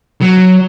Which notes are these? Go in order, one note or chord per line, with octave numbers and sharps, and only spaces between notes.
F#3